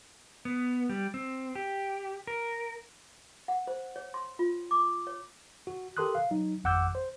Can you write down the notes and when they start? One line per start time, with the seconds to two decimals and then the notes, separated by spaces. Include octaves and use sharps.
0.45 B3
0.89 G3
1.14 C4
1.55 G4
2.27 A#4
3.48 F#5
3.67 C5
3.96 C#5
4.14 C6
4.39 F4
4.71 D6
5.07 C#5
5.67 F#4
5.97 G4 A4 A#4 C6 D#6 F#6
6.15 F5
6.31 F#3 D#4
6.64 G#1 F2 F#5 D6 E6 G6
6.95 C5